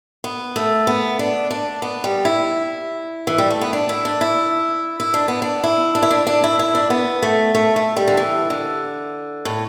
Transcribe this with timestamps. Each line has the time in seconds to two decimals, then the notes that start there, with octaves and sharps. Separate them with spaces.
0.24 B3
0.56 A3
0.87 B3
1.19 D4
1.51 D4
1.82 B3
2.04 G3
2.25 E4
3.27 E3
3.38 G3
3.50 A3
3.61 B3
3.73 D4
3.89 E4
4.05 D4
4.21 E4
5.00 E4
5.14 D4
5.28 B3
5.42 D4
5.64 E4
5.95 D4
6.03 E4
6.11 D4
6.27 D4
6.44 E4
6.59 E4
6.75 D4
6.90 B3
7.22 A3
7.55 A3
7.76 A3
7.96 G3
8.08 D3
8.17 E3
8.50 D3
9.45 A2